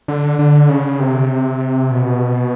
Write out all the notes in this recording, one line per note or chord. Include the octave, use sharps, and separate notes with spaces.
D3
D3
C#3
C3
B2